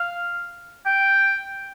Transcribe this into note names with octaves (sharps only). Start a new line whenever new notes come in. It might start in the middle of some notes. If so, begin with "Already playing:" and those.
Already playing: F5
G5